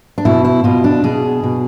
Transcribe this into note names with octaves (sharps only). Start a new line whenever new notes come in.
D4
B2 E4
E4
B2 F4
D4
B2 G#4
B2